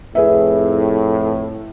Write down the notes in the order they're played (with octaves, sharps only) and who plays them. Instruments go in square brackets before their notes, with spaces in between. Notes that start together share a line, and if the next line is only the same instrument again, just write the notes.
[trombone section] F2 A2 [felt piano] G#4 B4 E5